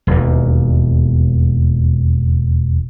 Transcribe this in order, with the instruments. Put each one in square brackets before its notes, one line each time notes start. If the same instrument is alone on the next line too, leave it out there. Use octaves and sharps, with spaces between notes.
[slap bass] E1 D#2